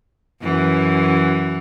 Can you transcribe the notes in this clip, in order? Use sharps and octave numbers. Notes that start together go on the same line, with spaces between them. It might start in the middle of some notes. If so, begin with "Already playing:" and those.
F#2 E3